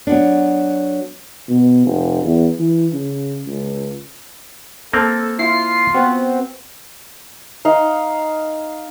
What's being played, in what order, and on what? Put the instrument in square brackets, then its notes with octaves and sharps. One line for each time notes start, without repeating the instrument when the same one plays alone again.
[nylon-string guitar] F#3 B3 D4
[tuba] B2
F1
E2
E3
C#3
C#2
[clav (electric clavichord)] A#3 C4 [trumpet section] A4
[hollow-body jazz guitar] E4 [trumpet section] F4 [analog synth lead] C7
[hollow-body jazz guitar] B3 F#4 [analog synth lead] C4
[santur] D#4 F5